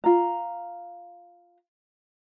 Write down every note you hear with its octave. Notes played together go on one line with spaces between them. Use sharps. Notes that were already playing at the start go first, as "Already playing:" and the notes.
F4 A#5